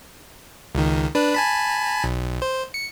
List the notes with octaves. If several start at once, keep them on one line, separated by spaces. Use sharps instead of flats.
C#2 D#3
D4 B4
G#5 A5 B5
B1
C5
C#7